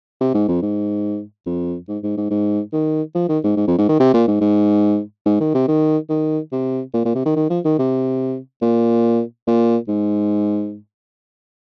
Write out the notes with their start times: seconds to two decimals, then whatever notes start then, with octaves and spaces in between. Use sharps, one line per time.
0.20 C3
0.34 G#2
0.48 F2
0.62 G#2
1.46 F2
1.88 G#2
2.03 G#2
2.17 G#2
2.30 G#2
2.72 D#3
3.15 F3
3.29 D#3
3.43 G#2
3.57 G#2
3.67 F2
3.78 G#2
3.88 D#3
4.00 C3
4.14 A#2
4.27 G#2
4.41 G#2
5.25 G#2
5.40 D#3
5.54 C3
5.68 D#3
6.09 D#3
6.52 C3
6.94 A#2
7.05 A#2
7.15 C3
7.25 D#3
7.36 D#3
7.50 F3
7.65 D#3
7.79 C3
8.62 A#2
9.47 A#2
9.88 G#2